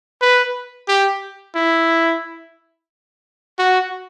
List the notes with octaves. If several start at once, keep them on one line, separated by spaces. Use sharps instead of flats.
B4
G4
E4
F#4